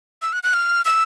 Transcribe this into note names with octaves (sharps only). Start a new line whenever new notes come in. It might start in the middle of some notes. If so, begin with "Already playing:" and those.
E6
F#6
F#6
F6
E6